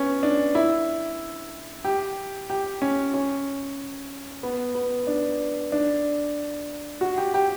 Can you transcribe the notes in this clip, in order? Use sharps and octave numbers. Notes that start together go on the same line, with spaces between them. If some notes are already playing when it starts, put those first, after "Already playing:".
Already playing: B3 C#4
D4
E4
G4
G4
C#4
C#4
B3
B3
D4
D4
F#4
G4
G4